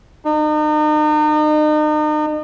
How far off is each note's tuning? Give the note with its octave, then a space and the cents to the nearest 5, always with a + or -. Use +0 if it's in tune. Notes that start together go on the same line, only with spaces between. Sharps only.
D#4 -40